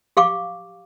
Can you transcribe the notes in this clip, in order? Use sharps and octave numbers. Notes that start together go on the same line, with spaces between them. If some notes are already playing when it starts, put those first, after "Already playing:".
G4 F5 C#6 D6